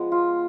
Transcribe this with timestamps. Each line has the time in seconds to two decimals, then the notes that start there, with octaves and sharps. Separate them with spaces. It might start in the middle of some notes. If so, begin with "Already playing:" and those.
Already playing: F3 G#3 B3
0.12 F4